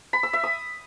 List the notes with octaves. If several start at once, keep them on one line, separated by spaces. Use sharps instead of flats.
B5
E6
E5
D#6